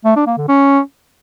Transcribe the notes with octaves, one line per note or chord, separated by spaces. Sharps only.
A3
D4
A#3
D3
C#4